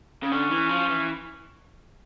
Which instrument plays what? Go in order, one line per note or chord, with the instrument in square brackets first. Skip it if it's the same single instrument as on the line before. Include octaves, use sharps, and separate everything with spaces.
[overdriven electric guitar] C#3
[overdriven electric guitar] D3 [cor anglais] C#4
[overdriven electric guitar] E3
F3
E3